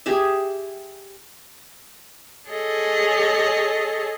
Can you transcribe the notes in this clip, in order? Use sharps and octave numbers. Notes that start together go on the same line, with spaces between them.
G4 G#4 E5
G#4 A4 C#5 D#5